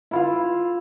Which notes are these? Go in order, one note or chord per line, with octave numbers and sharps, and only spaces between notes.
E4 F4 F5